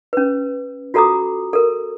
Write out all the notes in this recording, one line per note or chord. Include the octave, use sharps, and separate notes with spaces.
C#4 B4
F4 F#4 A4 A#5 D6 D#6
A4 A#4